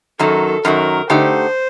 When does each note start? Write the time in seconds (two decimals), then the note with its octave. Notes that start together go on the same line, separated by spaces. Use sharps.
0.19 F#2 D#3 F#3 A4
0.65 F#2 D#3 F#3 A#4
1.10 D3 A3 D#4 G4 C5